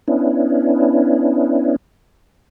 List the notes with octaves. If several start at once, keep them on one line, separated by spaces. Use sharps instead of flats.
B3 C#4 D4 E4